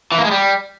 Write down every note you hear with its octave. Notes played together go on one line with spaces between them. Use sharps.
E3
A#3
G#3
G3